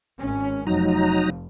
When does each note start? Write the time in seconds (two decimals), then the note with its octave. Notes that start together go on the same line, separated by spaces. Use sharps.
0.20 G#1 C#4
0.67 F1 F2 F#3 D#4 A#5